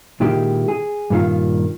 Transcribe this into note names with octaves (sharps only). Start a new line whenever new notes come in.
A#2 D#3 G#3 E4 G4
G#4
G2 A#2 D#3 F4 F5